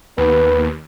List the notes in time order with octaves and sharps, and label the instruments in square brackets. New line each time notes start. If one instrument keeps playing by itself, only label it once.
[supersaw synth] D#2 [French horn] B3 [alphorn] B4